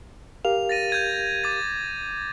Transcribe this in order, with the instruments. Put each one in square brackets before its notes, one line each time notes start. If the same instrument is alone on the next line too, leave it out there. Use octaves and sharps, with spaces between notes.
[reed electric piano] G4 A#4 F5 [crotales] F7
[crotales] A6 A#6 D#7
G6 G#6 D#7
D6 A6